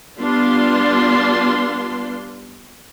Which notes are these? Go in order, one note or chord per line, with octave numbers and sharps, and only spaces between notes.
G3 B3 D4 F4 C6